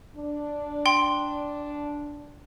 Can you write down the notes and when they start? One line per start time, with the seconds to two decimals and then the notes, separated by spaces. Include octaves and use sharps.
0.16 D4
0.86 G5 C6